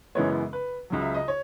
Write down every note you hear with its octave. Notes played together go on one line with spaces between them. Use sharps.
F#2 C#3 E3 G#3 B3 C#5
B4
C#2 C#3 F#3
E5
D#5
C#5